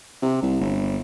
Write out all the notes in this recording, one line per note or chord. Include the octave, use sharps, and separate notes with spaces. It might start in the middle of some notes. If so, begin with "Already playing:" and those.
C3
C2
G1